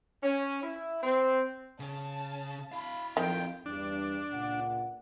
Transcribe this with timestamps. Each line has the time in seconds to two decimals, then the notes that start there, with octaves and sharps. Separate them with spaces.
0.23 C#4
0.63 E4
1.03 C4
1.80 C#3 A5
2.72 E4 F5 B5
3.17 F2 D#3 G5
3.66 E2 G2 D4
4.31 C#2 A#2 F#5